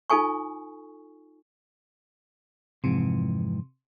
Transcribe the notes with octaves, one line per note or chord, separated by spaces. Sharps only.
D#4 F4 A4 G#5 C#6
F2 G#2 C3 E3